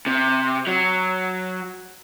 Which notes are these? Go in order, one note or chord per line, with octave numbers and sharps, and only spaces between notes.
C3
F#3